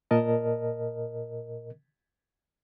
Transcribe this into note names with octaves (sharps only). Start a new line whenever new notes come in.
A#2 A#4 D#5 A5